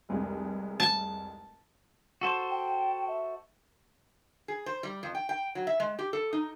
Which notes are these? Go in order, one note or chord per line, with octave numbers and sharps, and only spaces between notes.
F1 C2 G#3
A5
F#4 A4 C5
G5
E5
G#4
C5
G3
F2
G5
G5
F#3
E5
G#3
G4
A4
D#4